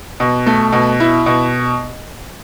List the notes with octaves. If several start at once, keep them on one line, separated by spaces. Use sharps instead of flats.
B2
A3
B2
E4
B2